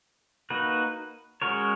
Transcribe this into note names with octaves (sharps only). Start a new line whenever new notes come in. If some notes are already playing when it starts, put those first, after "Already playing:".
A#3 D#4 F#4 B4
G#3 C#4 F#4 A#4 C#5